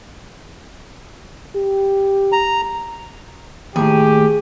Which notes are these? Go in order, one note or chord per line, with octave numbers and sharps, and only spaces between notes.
G4
A#5
D#2 A2 G4 G#4